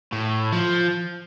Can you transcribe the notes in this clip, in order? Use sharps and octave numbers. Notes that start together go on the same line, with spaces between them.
A2
F3